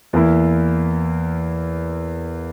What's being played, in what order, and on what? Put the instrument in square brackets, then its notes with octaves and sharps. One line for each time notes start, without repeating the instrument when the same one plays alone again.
[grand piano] E2 E3 A#3 E4